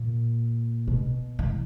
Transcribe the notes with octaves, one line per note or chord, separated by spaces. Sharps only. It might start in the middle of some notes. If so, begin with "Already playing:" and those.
Already playing: A#2
B2
E3